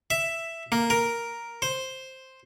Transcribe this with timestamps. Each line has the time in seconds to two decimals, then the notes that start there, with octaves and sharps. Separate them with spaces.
0.11 E5
0.72 A#3
0.90 A#4
1.62 C5